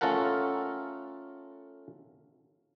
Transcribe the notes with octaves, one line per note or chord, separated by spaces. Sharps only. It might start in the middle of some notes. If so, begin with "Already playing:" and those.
A3 C#4 F4 A4 A#4 F#5